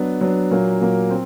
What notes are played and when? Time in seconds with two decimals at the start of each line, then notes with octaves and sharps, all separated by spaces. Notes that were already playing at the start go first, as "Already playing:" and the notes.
Already playing: F#3 B3 D4
0.21 F#3 B3 D4
0.51 A#2 F#3 A#3
0.81 A#2 F#3 A#3
1.10 C4